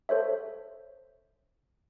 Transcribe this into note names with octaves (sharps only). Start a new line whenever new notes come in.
A4 C5 C#5 E5